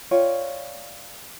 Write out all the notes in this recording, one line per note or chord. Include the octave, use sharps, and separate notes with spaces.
F4 C#5 D5 G5